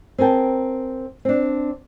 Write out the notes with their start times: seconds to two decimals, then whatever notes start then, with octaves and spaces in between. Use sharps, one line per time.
0.18 C4 G#4 A#4 G5 A5
1.25 C4 D4